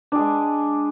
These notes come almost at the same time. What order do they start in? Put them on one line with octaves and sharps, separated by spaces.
D4 G#4 G#3